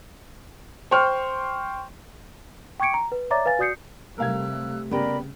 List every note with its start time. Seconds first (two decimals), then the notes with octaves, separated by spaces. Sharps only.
0.91 C5 G5 C6 C#6 F6
2.80 G5 C#6 D6 G#6 C#7 D7
2.94 A#5
3.12 B4
3.31 C#5 D5 E5 A#5 D6 A6
3.46 B4 F5 G#5 A6
3.59 F#4 D5 D#6 G6 C7 C#7
4.18 C3 G3 A3 A#4 F5 E6 F#6 G#6
4.91 C#3 B3 G4 A#4 D5 B5